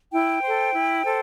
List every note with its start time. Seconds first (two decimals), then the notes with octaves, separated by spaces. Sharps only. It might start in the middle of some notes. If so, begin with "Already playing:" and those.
0.12 E4 G5
0.43 A4 C5
0.73 E4
1.03 A4 C5